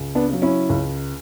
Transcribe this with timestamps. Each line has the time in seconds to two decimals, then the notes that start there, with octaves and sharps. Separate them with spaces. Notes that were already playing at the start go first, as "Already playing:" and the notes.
Already playing: C#2
0.15 B3 D4
0.29 C#3 F#3
0.42 C#4 E4
0.69 C#2